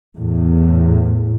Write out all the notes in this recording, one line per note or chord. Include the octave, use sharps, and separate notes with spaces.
E2 A2